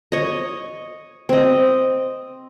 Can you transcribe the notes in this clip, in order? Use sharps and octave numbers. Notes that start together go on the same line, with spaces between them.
C#5 D#5
C4 D#5